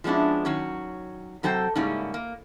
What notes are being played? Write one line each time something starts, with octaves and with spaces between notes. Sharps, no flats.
F3 G#3 B3 C#4 D4 E4
D#3 F#3 C#4 C#5
C3 F#3 A4 C5 G5
G#2 C#3 G3 A#3 C#4 E4
A#3